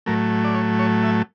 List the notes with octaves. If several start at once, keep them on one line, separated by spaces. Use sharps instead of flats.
A2 F#3 A3 A#4
D5
C#5
C#5
E5